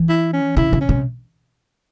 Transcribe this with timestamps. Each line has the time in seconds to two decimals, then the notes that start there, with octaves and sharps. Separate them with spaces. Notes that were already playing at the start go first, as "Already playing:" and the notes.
Already playing: E3
0.09 E4
0.33 C#4
0.57 C#3 E4
0.73 C#3
0.81 C#4
0.89 C3